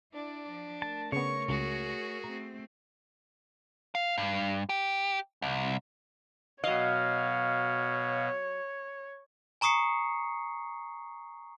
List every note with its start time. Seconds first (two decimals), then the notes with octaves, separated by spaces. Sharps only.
0.13 D4 E4 D5
0.50 F3
0.82 A3 A#4 A5
1.12 C#3 B3 C#5 C#6
1.49 C#2 F#4 G#4
2.24 A3 C4 A#5
3.95 F5
4.18 G2
4.69 G4
5.42 C2
6.64 B2 F#3 C#5 D#5 F5
9.61 G#5 A#5 C#6 D#6 C7 C#7